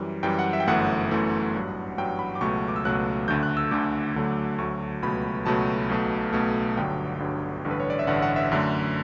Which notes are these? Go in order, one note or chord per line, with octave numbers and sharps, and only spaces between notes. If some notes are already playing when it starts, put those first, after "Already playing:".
Already playing: F#2 E3 G3
F#2 E3 G3 G5
F#5
E5
G5
G1 F#2 E3 A3 F#5
G1 F#2 E3 A3
A1 G2 F#3
A1 G2 F#3 G5
B5
D6
C#2 B2 F#3 A3 C#6
D6
E6
C#2 B2 F#3 A3 F#6
D2 D3 A3 G6
F#6
E6
D2 D3 A3 D6
D2 D3 F#3 A3
D2 D3 F#3 A3 C#6
C#2 B2 F#3 A3 B5
C#2 B2 F#3 A3 A5
B1 B2 A3
B1 B2 A3
G1 G2 D3 F#3 G5
G1 G2 D3 F#3
A1 G2 D3
B4
C#5
D5
E5
A1 G2 D3 F#5
F#5
E5
F#2 D3 A3